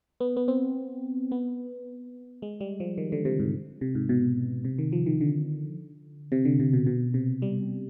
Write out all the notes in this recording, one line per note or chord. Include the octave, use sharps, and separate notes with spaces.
B3
B3
C4
B3
G#3
G3
F3
D#3
D3
C3
G#2
C3
G#2
B2
C3
D#3
F3
D#3
D3
C3
D3
C3
B2
B2
C3
G3